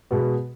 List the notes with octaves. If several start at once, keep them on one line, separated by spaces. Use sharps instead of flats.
B2 G#3 B3 F#4